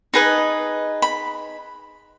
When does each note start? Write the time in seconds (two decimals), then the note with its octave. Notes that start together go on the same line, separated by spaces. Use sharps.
0.14 D#4 G#4 B4 D#5 A5
1.02 B5